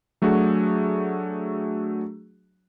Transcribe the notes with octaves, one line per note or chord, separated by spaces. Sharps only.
F#3 A3 D4 F#4 G#4